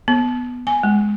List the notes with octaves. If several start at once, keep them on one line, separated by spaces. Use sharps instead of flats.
B3
G#5
G#3